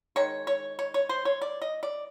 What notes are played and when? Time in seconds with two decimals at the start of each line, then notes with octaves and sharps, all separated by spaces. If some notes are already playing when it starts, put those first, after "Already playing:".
0.16 D#3 G#3 C#5
0.47 C#5
0.79 C#5
0.94 C#5
1.09 C5
1.25 C#5
1.42 D5
1.62 D#5
1.83 D5